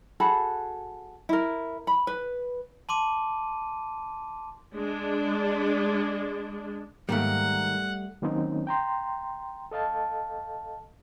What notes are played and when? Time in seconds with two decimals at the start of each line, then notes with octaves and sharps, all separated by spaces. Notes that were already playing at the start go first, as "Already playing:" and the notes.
0.20 F#4 G#4 A4 B5
1.29 E4 A#4
1.87 B5
2.07 B4
2.89 A5 C6 D6 D#7
4.74 G#3 D4
7.09 G#2 D#3 G3 A3 A#3 F#5
8.22 D#3 F#3 A#3 C4 C#4 D#4
8.67 G5 A#5 C6
9.71 A4 D#5 F5 A5